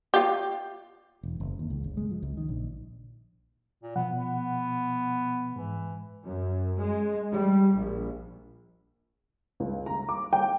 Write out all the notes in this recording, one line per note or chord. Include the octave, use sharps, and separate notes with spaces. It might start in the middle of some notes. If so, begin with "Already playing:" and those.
F4 G4
E1
F#1
D#2
C#2
G1
G#3
F3
C#2
D#3
A#1
A#2
B2 F3 B3 F#5
B3
G#2 E3
F#2
G#3
G3
A#1
C#2
A#5
D6
G5